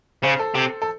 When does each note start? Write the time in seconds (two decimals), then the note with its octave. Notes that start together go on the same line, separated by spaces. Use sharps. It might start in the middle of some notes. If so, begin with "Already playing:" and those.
0.24 C#3 C5
0.39 A4
0.55 C3
0.82 A4